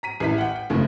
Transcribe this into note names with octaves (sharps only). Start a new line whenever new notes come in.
A#5 B6 D#7
A1 E4 B6
F#5 G5
G5
G1 C#3 F3 A3